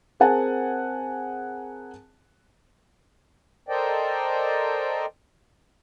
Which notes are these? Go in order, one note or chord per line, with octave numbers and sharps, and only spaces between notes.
C4 G#4 A#4 F#5 G#5 A5
A4 A#4 C5 D5 D#5 G5